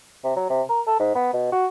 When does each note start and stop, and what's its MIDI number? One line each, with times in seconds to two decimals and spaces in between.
0.24 0.33 48
0.36 0.47 54
0.50 0.62 48
0.69 0.81 70
0.87 0.95 69
1.00 1.14 44
1.15 1.32 59
1.33 1.49 47
1.52 1.67 66